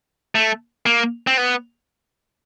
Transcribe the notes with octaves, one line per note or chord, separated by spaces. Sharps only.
A3
A#3
C4
B3